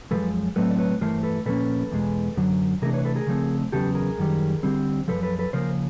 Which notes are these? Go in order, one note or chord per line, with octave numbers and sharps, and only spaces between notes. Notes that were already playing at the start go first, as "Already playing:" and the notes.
F#2 D3 F3 G#3 A4 B4
A2 F#3 A3 C4 A4 B4
D5
B4 C#5
G2 E3 A3 A#4 C5
A4 B4
A#2 F3 A#3 C#4 A4 B4
E2 B2 G#3
F#2 D3 F#3
C3 E3 A3 D4 G#4 A#4
B4 C#5
A4 B4
G#4 A#4
C#3 F3 A3 C4
E2 C#3 F#3 B3 G4 A4
G#4 A#4
F#2 D#3 G3
D3 G3 C4
F#2 C#3 F3 A4 B4
A4 B4
A4 B4
C#3 F3 A#3 A#4 C5